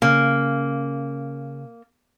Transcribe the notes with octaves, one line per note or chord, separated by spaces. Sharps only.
C#3 A#3